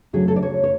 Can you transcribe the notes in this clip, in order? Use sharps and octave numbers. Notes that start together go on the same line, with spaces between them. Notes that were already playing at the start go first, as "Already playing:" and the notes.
D2 C#3 F#3 G#4
A4
D5
C#5
C#5